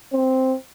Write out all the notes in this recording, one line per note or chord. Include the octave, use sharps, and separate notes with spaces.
C4